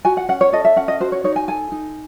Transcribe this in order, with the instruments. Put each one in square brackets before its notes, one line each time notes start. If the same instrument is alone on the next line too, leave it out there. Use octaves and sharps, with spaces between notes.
[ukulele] F#4 G#5
F#5
C#4 F#5
C#5
A4 D#5
E5
C#4 F#5
D#5
F#4 C5
C#5
D#4 C#5
G#5
A4 G#5
D#4